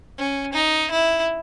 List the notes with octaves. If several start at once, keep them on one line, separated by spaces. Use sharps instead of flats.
C#4
D#4
E4